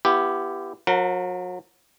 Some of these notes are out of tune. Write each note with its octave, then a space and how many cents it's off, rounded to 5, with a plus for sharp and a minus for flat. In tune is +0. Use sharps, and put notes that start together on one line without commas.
B3 +0 E4 +30 G4 +0
F#3 -40 A#4 +0 F#5 +0